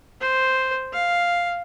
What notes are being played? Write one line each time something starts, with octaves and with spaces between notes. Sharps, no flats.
C5
F5